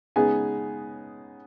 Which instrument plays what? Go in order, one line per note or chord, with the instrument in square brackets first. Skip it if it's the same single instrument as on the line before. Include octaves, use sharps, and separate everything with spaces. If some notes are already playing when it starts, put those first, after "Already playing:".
[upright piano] C#3 G#3 B3 D#4 G#4 G#5